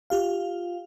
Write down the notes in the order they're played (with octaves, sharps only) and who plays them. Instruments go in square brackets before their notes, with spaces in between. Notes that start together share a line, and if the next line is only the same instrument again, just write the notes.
[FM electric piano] F4 G4 F5